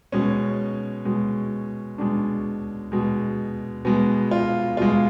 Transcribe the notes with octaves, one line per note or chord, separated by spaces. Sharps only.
B2 G#3 C#4
B2 G#3
B2 G#3 D4
B2 G#3
B2 G#3 B3
F4
B2 G#3 F4